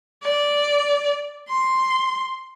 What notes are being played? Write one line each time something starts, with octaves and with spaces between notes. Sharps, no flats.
D5
C6